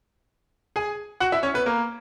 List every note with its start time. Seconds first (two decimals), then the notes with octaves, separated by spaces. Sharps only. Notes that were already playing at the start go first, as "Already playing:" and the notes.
0.76 G#4 G#5
1.20 F#4 F#5
1.32 E4 E5
1.43 C#4 C#5
1.54 B3 B4
1.66 A#3 A#4